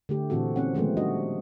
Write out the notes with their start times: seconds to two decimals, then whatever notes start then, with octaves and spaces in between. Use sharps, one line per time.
0.09 D3 A3 G4
0.30 A#2 E3 C4 F#4 A4
0.56 C4 C#4 F#5
0.74 D#3 F3 G#3 A3 B3
0.97 G3 D4 F#4 D#5